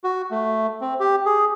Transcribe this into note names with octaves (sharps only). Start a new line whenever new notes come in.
F#4
A3
C4
G4
G#4